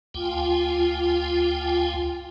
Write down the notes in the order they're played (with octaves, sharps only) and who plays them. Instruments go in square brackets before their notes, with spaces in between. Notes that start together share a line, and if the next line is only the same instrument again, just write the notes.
[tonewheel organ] D2 G5 G#5 [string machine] F4